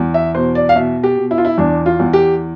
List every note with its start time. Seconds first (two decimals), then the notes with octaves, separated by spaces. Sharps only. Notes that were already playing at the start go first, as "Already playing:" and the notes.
Already playing: E2
0.14 E5
0.35 B2 C5
0.55 D5
0.69 F5
0.75 B2 E5
1.03 G4
1.17 B2
1.31 E4
1.38 F4
1.45 E4
1.58 E2 D4
1.86 F4
2.00 E2
2.13 G4